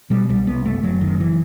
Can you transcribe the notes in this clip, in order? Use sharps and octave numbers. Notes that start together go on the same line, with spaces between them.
B2 G3
C2 G3
C2 B3
F#1 A3
F#1 F#3
F#2 D#3
E3